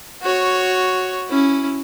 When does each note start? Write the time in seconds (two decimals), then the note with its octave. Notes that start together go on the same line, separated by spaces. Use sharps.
0.22 F#4 C#5
1.28 C#4 E4